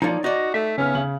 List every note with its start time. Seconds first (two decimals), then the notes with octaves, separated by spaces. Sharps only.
0.02 F3 A#3 D#4 C#5 D5
0.24 D#4 F#4 D5 D#5
0.54 A3 E5
0.77 C#3 B3 C#4 F6
0.95 C#3 F#7